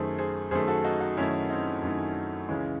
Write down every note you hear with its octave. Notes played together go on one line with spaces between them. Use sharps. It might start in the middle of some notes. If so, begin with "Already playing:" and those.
Already playing: F#2 D#3 A3 G#4 C5
G#4 C5
F#2 D#3 A3 G#4 C5
F#4 A4
D#4 F#4
D#4 F#4
F#2 D#3 A3 C#4 E4
C4 D#4
F#2 D#3 A3
C#2 C#3 E3 G#3 C#4